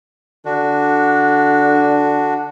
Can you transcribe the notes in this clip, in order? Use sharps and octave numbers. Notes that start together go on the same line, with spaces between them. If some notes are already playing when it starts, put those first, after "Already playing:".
D3 D4 F#4